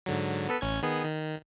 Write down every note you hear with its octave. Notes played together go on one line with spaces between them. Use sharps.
G#2 D3 F#3
B3 A4 B4
A1 C#4 G#6
D#3 B3 G#4
D#3